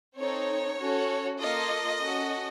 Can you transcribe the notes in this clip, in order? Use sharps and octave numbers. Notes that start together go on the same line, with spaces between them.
C4 D#4 A4 C#5
C#4 F#4 A4
A#3 F4 A4 D#5
C#4 F#4 A4